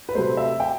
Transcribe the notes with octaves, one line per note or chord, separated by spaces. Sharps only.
B4
C3 F#3 A3 C5
E5
G5